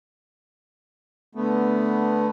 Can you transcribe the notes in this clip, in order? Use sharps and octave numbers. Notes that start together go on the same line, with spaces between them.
D3 A3 B3